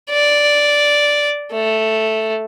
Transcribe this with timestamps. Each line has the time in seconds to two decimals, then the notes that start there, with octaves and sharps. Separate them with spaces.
0.10 D5
1.52 A3